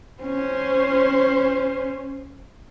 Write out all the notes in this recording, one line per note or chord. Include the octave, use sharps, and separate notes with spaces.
C#4 C5